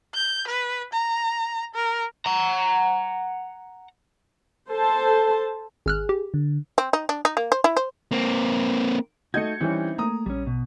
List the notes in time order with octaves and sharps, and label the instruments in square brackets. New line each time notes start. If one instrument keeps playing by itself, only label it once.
[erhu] G6
B4
A#5
A#4
[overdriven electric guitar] F#5 A#5
[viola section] A4 C5 A5
[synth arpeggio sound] G#1 F6 F#6 [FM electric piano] G#4
[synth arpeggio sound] G4
[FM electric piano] D3
[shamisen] C4
D#4
D4
D#4
A#3
C5
E4
C5
[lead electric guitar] A#3 C4
[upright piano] A3 D#5 G#6 [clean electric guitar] D#4 F#4 [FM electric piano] G6 C#7
[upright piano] E3 G3 C#4 [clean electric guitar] C4 D#4 E4
[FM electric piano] A3 A#3 [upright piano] A#5 D#6
[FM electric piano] A#1 [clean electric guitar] G3 C#4
[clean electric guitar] B2